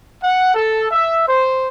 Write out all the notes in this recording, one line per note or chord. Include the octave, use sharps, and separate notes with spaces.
F#5
A4
E5
C5